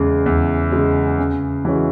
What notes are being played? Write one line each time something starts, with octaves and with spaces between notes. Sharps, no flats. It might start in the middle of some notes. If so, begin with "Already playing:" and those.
Already playing: E2 C#3 G#3
E2
C#3 G#3
C#3
E3 G#3 C#4 F#4